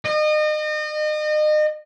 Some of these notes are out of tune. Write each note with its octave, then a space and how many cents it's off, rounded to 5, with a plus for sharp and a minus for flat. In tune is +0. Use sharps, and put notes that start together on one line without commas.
D#5 -35